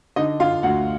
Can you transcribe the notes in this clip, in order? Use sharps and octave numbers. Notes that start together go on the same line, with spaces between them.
D3 D#4 D#5
D3 F4 F5
D2 F#4 F#5